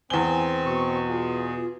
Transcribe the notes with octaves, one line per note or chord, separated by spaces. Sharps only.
E2 C4 G#5 G7
B2 C#6
F4 G#4